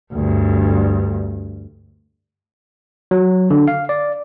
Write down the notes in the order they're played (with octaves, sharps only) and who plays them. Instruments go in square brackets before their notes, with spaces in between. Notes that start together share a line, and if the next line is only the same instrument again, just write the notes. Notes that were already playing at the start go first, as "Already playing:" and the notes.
[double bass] D2 G2
[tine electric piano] F#3
D3
F5
D5